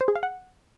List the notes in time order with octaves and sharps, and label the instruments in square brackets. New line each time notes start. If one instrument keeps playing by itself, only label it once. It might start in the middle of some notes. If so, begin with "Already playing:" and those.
[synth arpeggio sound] C5
G#4
F5
F#5